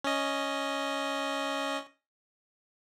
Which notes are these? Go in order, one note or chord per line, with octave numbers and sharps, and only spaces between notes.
C#4 D#5